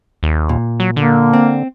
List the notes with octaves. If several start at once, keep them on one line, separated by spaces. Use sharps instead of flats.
D#2
A#2
F#3
D3 A#3
C4